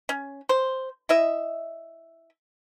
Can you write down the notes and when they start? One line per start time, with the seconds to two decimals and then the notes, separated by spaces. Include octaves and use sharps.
0.09 C#4
0.49 C5
1.09 E4 D#5 E5